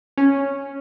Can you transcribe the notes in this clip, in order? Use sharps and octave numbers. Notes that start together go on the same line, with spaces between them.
C#4